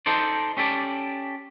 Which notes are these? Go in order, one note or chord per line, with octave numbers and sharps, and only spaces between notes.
D#4 A4 C5 D5
C#4 G4 A4 D5